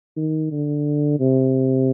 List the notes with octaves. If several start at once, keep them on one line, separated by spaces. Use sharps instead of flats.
D#3
D3
C3